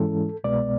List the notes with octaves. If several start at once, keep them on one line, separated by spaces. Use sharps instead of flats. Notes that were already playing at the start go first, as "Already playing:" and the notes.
Already playing: G#2 E3 G#3 C#4 E4 A4
C2 B2 G#3 B3 D5